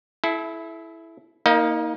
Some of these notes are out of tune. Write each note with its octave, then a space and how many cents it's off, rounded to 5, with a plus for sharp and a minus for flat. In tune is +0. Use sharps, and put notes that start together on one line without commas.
E4 +0 A4 -40
A#3 +0 D#4 +30 D#5 -15